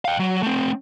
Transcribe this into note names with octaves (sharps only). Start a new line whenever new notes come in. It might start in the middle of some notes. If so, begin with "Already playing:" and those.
F5 G5
F#3
A3 C4